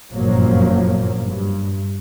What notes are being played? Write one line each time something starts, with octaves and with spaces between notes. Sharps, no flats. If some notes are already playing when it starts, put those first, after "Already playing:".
G1 F#2 A#2 F3 F#3 A#3
G2